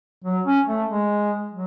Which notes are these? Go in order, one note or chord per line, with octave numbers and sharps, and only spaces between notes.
F#3
C#4
A3
G#3
F#3